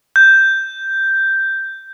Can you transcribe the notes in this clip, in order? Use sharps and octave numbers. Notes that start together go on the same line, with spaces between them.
G6